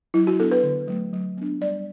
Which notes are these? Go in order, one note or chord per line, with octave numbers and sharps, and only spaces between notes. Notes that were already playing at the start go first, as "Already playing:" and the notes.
F#3 E4
F#4
B3 D4 A4
B4
D3
F#3 A3
F#3
B3 D4
G3 D5